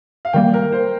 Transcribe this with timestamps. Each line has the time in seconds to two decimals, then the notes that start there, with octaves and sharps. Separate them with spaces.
0.25 F5
0.33 D#3 G3 A#3 G5
0.53 A#4
0.72 C5